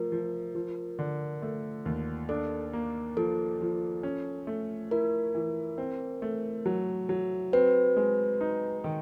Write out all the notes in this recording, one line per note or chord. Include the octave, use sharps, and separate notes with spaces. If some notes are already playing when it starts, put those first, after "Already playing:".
Already playing: F3 A3 A#4
F3
F3
D3
A3
D#2
D4 A4
A#3
F3 A4
F3
C#4
A3
E4 A#4
E3
C4
A3
F#3
F#3
C4 B4
G#3
D#4
D#3